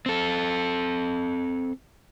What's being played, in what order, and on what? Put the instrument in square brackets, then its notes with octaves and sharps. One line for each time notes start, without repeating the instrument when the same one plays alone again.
[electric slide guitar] C4 A4